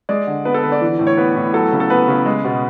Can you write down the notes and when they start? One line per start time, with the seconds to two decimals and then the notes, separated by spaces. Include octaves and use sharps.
0.09 G#3 D5
0.27 D3
0.45 B3 B4
0.54 A4
0.63 D3 B4
0.72 D5
0.81 E3
0.99 A2
1.07 C#5
1.17 B3 B4
1.36 A2
1.53 F#3 A4
1.73 C#3
1.80 A4
1.90 B3 B4
2.08 C#3
2.26 G#3
2.44 B2